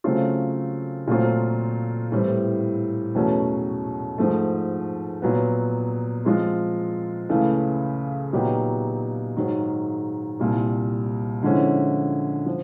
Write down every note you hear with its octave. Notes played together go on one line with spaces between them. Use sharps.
C#3 F#3 A3 C4 F4
A#2 F#3 A3 C4 F4
A2 E3 G3 C4
E2 B2 F#3 A3 C#4
G#2 F3 A3
A#2 F#3 B3
F3 G#3 C4 F4
C#2 C#3 E3 A3
A#2 F#3 B3 D#4 G4
G#2 D#3 F#3
C2 A#2 G3
D3 F3 G#3 C#4 E4
F3